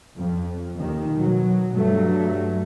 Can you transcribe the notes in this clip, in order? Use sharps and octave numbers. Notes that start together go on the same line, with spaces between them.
F2
D#2 D#3
B2 F#3
G2 F#3 A3